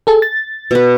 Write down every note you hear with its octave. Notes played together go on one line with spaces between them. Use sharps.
G#4 A4
A6
B2 B4